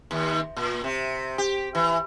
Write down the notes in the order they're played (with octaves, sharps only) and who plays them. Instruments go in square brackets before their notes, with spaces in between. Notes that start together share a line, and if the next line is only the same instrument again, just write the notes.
[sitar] D#2
A#2
C3
G4
E3